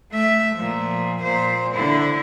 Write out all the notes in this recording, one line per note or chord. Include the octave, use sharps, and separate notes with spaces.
A3 E5
A#2 F3
A#2 C5
D3 E4